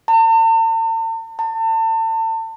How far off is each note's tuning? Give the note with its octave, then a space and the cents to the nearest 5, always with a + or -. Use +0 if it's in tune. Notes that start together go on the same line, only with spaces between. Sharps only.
A5 +45
A5 +35